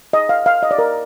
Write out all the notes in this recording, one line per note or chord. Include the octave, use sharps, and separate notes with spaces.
D#5
F5
F5
D#5
D5
A#4